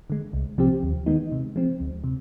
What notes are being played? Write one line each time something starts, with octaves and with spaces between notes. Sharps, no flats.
D3 G#3
C2
C3 F3 C4 G4
D#2
D#3 G#3 B3 D#4
C3
F3 G#3 C4
D2
C3